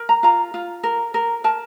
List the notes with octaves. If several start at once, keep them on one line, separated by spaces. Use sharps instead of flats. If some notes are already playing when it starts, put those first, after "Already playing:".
Already playing: A#4
A#5
F4 A#5
F4
A#4
A#4
A#4 A5